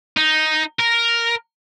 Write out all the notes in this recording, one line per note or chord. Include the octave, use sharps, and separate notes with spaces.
D#4
A#4